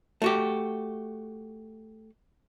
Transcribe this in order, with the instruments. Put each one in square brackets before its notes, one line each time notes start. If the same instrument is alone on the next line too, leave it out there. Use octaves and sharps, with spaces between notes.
[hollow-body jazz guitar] A3 F#4 G4